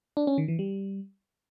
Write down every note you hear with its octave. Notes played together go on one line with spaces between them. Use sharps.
D4
C#4
D#3
E3
G3